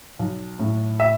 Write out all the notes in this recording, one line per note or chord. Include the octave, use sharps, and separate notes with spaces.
B1
A2
E5